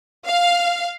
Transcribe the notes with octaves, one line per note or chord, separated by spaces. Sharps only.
F5